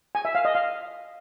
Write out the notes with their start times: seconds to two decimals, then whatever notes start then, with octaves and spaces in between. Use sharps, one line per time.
0.15 G#5
0.25 E5
0.35 F5
0.45 D#5
0.55 F5